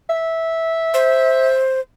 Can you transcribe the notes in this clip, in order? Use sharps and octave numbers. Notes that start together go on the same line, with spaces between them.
E5
C5